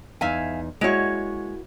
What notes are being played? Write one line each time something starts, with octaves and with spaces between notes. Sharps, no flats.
E2 D#4 E5 F5 G#5
G#3 A#3 E4 F#4 C#5